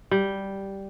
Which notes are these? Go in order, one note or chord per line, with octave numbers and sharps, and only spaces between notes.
G3